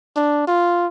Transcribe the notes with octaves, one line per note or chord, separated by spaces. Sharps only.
D4
F4